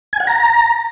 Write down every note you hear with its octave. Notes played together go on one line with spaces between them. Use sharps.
G#5
F#5
A#5